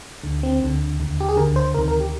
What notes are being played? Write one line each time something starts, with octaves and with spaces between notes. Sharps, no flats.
D2 D3
C4
D2 D3
D#2 D3
G4
G#4
D2 D3 A#4
C5
D2 C3 D#3 A#4
A#4
G4